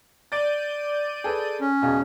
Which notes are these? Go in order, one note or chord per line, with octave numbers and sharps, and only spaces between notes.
D5 G6 A6 D7 D#7
G#4 A4 B4
C#4
E1 C#2 G#4